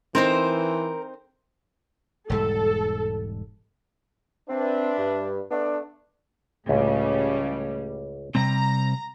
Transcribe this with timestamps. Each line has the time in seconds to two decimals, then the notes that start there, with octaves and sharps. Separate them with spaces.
0.15 E3 C4 D#4 A#4 C5
2.30 E1 G#2 G3 A4
4.49 C4 D4 B4 E5
4.98 G2
5.51 A3 B3 D4
6.69 C#2 A2 C#3 G3
8.35 C3 G3 C4 A#5